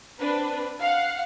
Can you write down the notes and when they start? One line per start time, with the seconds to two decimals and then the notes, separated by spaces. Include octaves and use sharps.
0.18 C4 D4 B4
0.80 F5 F#5